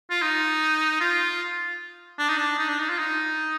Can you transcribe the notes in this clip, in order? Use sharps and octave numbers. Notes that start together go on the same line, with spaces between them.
F4
D#4
F4
D4
D#4
D4
D#4
D4
D#4
F4
D#4